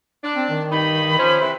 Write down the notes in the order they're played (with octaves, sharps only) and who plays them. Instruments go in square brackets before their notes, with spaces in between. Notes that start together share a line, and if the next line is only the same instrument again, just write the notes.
[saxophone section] D4
[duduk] C4
D#3
[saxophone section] G2 D#4 [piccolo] B5
[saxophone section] F3 C#4 [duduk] C5
[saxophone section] C3 E3